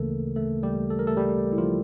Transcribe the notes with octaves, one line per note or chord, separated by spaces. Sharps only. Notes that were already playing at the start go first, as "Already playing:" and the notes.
Already playing: D2 C#3 E3 A3 A#3 A4 A#4
A3 A4
G3 G4
A4
A#4
A3 A4
G3 G4
E4
F3 F4